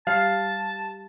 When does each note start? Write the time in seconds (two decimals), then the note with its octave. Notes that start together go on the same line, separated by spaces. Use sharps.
0.07 G3 F5 A5